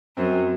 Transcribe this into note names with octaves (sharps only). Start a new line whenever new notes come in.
F#2 C4